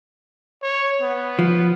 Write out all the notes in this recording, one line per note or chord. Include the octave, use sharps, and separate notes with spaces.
C#5
B3
F3